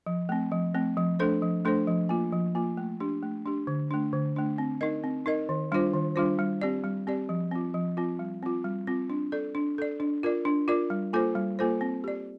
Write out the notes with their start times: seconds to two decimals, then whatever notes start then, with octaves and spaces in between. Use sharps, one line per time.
0.06 F3
0.29 A3 C4
0.52 F3
0.74 A3 C4
0.97 F3
1.19 A3 D4 A4 C5
1.42 F3
1.65 A3 D4 A4 C5
1.88 F3
2.09 A#3 F4
2.32 F3
2.55 A#3 F4
2.77 A3
3.00 D4 G4
3.23 A3
3.46 D4 G4
3.67 D3
3.91 A3 D4
4.13 D3
4.36 A3 D4
4.58 C4
4.81 D#4 A#4 D#5
5.04 C4
5.26 D#4 A#4 D#5
5.49 D#3
5.72 G3 D4 F4 C5
5.94 D#3
6.16 G3 D4 F4 C5
6.39 G3
6.62 C4 G4 D5
6.84 G3
7.07 C4 G4 D5
7.29 F3
7.51 C4 F4
7.74 F3
7.97 C4 F4
8.19 G3
8.43 C4 F4
8.65 G3
8.87 C4 F4
9.10 D4
9.32 A4 D5
9.55 D4
9.78 A4 D5
10.00 D4
10.23 F4 A#4 D5
10.45 D4
10.68 F4 A#4 D5
10.90 G3
11.13 A#3 F4 A4 C5
11.35 G3
11.59 A#3 F4 A4 C5
11.81 C4
12.04 G4 D5